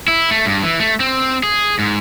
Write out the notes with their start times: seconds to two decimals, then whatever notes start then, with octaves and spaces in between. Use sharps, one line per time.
0.08 E4
0.31 A3
0.46 G2
0.63 E3
0.80 A3
1.00 C4
1.43 G#4
1.79 G#2